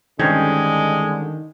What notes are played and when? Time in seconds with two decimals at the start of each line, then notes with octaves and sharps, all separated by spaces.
0.19 G2 D3 D#3 G#3 C4 C#4